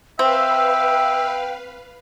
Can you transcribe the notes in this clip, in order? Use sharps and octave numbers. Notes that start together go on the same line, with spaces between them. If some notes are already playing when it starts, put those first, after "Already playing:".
C4 B4 E5 F5 G5